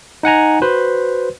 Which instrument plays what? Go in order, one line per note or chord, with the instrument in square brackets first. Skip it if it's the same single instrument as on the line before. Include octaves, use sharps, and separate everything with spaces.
[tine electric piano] D#4 F#5 G#5 A#5
F#4 B4 C5